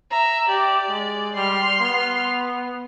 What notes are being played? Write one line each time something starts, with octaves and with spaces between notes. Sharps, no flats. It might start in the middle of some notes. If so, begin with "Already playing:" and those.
E5 A#5
G4 D5
G#3
G3 C6 F6
B3